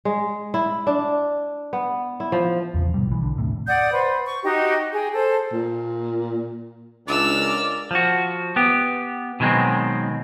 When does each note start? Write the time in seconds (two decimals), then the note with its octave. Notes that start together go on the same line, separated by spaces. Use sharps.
0.05 G#3
0.54 E4
0.87 D4
1.73 B3
2.20 E4
2.32 F3
2.74 E2 A#2 C#3 F3
2.94 G#2 B2 F3 G3
3.07 B1 E3
3.23 D3
3.37 D#2 A2 C3
3.67 D5 F#5 D#6 G6
3.93 B4 C5
4.25 C#6
4.44 D#4 F#4 G4 D#5
4.93 G#4 G5
5.13 A4 C5
5.53 A#2
7.08 C#2 D4 D5 E5 E6 F6
7.38 A#4
7.91 F3 F#4
8.56 B3 G4
9.40 B2 D#3 F#3 G#3 C4